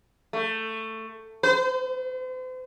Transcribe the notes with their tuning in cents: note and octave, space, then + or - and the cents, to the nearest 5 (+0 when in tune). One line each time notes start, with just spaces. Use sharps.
A3 +15
C5 -40